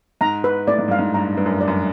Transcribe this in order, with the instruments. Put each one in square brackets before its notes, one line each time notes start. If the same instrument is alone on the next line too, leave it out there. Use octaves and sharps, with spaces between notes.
[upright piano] G#2 [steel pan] A#5
[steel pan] B4
[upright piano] A2 [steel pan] D5
[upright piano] G#2
[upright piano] G2 [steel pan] F5
[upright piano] G#2
[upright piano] G2 [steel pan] A#5
[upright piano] G2 [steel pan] B4
[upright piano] F#2
[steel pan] D5
[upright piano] F#2